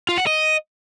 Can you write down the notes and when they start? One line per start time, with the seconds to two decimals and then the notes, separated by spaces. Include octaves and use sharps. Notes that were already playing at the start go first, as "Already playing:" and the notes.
0.09 F4
0.18 F#5
0.27 D#5